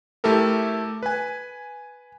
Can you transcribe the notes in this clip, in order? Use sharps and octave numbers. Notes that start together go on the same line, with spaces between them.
A3 E4 G4 A4 A#4
B4 G#5